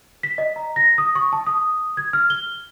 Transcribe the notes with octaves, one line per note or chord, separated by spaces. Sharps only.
B6
D#5
A#5
A#6
D#6
C#6
A5
D#6
G#6
F6
G7